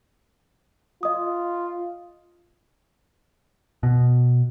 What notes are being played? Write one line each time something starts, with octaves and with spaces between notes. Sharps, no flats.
F4 D#5 D#6
B2